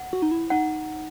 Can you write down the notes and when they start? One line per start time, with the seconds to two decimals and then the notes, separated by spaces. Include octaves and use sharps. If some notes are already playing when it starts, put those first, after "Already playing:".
Already playing: F#5
0.13 F#4
0.22 D#4
0.31 E4
0.50 D#4 F#5